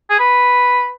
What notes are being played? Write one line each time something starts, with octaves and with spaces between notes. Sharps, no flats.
G#4
B4